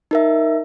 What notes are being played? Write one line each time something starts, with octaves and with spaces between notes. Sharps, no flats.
D#4 A#4 E5